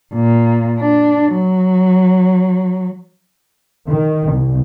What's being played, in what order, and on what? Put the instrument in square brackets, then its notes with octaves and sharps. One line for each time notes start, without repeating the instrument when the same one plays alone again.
[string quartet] A#2
D4
F#3
[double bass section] D#3
C2